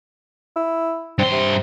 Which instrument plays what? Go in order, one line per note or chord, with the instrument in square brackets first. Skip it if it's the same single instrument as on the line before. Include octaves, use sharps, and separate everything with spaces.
[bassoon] E4
[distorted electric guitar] G2 C6 [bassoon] C4
[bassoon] C3